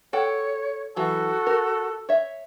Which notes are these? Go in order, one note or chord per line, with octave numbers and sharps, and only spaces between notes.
A4 C#5 F#5 G5
E3 F#3 F#4 A4
A#4
C#5 E5